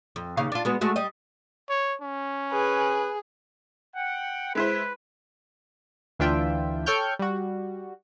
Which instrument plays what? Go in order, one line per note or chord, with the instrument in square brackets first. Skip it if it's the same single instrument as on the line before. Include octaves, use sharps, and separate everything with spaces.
[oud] F2
D#2 C#3 F5
D4 F4
G#3 B3 F#4
G#3 A3 F#4
G3 D#5
[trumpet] C#5
C#4
[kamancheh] G#4 [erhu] B4
[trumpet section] F#5 G5
[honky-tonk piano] G#3 E4 C5 [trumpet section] B4
[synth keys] D2 E3 D4 F4 E5 G5
A4 C#5 G5 C#6 F6 G6
G3 F#4